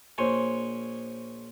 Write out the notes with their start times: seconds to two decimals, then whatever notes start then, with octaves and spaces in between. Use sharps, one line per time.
0.18 A#1 C5 C#5 G#5